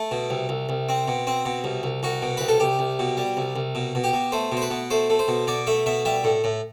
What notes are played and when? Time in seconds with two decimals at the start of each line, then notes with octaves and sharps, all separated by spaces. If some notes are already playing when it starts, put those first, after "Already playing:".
Already playing: A3 E4
0.11 B2
0.30 C2
0.49 C2
0.69 C2
0.89 C4
1.08 B2
1.27 C4
1.45 B2
1.64 C2
1.83 C2
2.03 C2 F#4
2.22 B2
2.37 C2 B4
2.48 A4
2.60 C2 G4
2.79 C2
2.99 B2
3.17 G3
3.37 C2
3.56 C2
3.75 B2
3.95 B2
4.04 G4
4.13 B2
4.32 A3 C5
4.52 B2
4.57 C5
4.62 B4
4.71 B2
4.90 A3 C5
5.10 A3
5.19 C5
5.28 B2
5.47 B2 D5
5.67 A3 E5
5.86 B2 E5
6.05 G3 E5
6.24 A2
6.44 A2